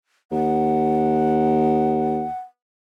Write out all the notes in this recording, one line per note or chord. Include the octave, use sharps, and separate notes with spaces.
D#2 F#5